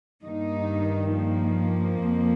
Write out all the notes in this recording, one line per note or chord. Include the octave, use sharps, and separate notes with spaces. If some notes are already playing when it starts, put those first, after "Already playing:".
G2 D#3 A#3 D#4
F3 A#3
F2